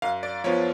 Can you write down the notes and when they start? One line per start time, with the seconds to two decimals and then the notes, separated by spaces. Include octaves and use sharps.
0.02 F#2 F5
0.23 D5
0.44 F3 B3 F4 C#5